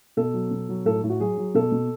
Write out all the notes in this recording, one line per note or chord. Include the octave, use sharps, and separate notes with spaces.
B2 A4
F#3
B2
F#3
A2 A4
A2
F#4
F#3 G#4
F#3
B2 A4
B2